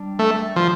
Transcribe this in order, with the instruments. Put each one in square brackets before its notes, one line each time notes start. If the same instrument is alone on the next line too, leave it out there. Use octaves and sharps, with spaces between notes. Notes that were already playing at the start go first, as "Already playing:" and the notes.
Already playing: [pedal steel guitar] G3 D4 G4
[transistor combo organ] A3
F3